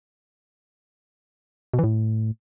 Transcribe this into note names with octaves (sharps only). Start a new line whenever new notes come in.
B2
E3
A2